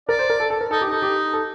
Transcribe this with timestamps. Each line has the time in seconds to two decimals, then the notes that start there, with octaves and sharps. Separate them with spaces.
0.09 A#4 D5
0.19 C5
0.30 A#4
0.40 A4
0.50 A4
0.61 A#4
0.71 D#4 A4
0.81 G4
0.87 D#4
0.92 A4
1.02 G4
1.33 A4